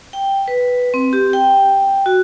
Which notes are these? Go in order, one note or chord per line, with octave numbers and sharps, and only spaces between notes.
G5
B4
C4
G4
G5
F#4